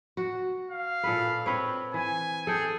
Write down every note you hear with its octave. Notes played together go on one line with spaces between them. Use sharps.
F#4
F5
A#2 A4 B4
C4 B4 C#5
E3 G#5
G#4 A4 G5